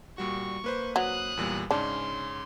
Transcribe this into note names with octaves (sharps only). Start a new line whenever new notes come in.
A#2 G3 F#4 C#6
A#3 B4 C5
F#3 D#6 F#6
E2 A#2 G3
G#2 C#3 C#4 D4 C6